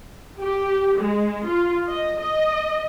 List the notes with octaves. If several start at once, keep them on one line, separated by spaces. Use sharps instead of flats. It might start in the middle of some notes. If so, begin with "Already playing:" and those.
G4
G#3
F4
D#5
D#5